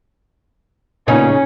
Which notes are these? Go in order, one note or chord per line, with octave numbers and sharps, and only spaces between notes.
A#2 C#3 B3 C#4 D#4